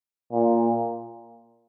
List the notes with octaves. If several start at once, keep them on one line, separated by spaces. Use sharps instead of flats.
A#2